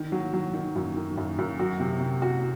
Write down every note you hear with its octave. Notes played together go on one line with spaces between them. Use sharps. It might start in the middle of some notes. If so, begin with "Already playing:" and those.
Already playing: D#3
F#3
F#3
D#3
F#2
D#3
F#2
F#2
F#4
C3
C3
F#4